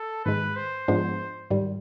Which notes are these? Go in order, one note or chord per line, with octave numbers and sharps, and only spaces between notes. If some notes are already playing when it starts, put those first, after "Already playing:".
Already playing: A4
G#2 D#3 G#3 B4
C5
G#2 F3 G#3 B3 D4
G#2 D#3 G3